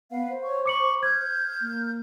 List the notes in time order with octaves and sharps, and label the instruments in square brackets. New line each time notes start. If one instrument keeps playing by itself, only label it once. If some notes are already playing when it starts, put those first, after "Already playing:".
[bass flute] B3 [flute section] B4 F5 F#5
[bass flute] C5
[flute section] C#5 C#6
[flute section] B5 C#6 [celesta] D6 C#7 F#7
[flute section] F6 G6 [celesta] G#6
[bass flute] A#3